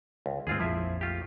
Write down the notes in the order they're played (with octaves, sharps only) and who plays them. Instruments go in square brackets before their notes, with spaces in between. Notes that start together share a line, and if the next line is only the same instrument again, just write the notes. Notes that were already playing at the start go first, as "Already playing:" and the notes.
[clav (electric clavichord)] C#2
[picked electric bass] D#2 G#2 [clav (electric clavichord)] C4 F4 G#4
[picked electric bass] A#1 F2 [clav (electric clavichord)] F3 E4 E5
[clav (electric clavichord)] A3 F4 G4